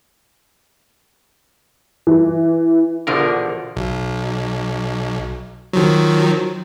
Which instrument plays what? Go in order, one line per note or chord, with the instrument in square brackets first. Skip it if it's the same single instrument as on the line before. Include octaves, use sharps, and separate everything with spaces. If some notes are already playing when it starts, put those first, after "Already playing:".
[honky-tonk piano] E3
[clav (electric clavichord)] A#1 F3 A#4 [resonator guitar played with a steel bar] E2 B2 D3
[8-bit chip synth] B1
D#3 F3 F#3